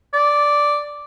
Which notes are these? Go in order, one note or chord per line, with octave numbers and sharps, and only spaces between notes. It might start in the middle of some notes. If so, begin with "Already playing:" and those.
D5